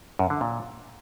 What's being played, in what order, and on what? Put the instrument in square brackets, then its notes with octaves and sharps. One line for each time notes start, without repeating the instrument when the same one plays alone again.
[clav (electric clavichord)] F#2
D3
A#2